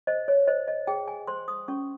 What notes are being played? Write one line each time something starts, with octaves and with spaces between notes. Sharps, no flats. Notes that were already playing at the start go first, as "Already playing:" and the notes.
C5 D#5
C#5
C5 D#5
D#5
G#4 G5
G#5
C5 C6
D#6
C#4 C#6